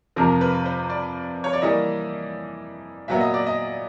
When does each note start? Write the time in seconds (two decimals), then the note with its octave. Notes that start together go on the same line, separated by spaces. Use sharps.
0.16 F2 C3 F3 A#4
0.41 B4
0.66 C5
0.90 D5
1.44 C#5
1.53 D5
1.62 E3 G3 A#3 D#5
3.08 A#2 F#3 B3 E5
3.21 D#5
3.34 D5
3.46 D#5